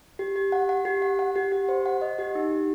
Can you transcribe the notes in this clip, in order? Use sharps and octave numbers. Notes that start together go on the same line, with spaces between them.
G4
G4
F#5
F#5
G4
F#5
F#5
G4
G4
C5
F#5
D#5
G4
D#4
G4